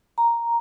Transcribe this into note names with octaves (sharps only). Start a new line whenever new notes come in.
A#5